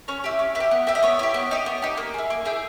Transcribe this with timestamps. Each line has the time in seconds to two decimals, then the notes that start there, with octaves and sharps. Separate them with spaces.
0.08 C#4 C#5
0.24 E4 G4
0.39 C#4
0.55 E4 B4
0.60 G4
0.71 B3
0.87 E4 G4 E5
0.95 D#5
1.03 B3 C#5
1.19 E4 G4
1.34 B3
1.51 D#4 G4
1.66 B3
1.82 D#4 G4
1.97 A#3
2.14 E4 G#4
2.30 A#3
2.45 E4 G#4 G5